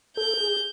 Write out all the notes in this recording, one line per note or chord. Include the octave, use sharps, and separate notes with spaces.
A4 G6
G#4